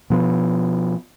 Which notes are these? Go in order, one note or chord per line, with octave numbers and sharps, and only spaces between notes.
B2 F3 B3